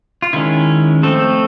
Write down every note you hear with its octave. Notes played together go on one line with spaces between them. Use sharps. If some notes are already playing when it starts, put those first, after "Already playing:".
F4
D#3 G#3 C#4 E4
F3 A3 C4 A4